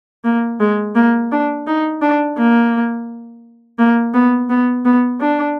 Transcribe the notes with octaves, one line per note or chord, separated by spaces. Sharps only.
A#3
G#3
A#3
D4
D#4
D4
A#3
A#3
B3
B3
B3
D4